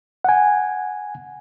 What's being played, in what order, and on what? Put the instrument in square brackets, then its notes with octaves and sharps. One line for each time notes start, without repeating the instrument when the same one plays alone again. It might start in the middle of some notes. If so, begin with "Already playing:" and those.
[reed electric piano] F#5 G#5